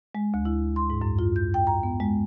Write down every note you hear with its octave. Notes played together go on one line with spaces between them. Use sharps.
G#3
D2
E4
C6
G#2
F#2
F4
G6
G5
A#5
B3
G#3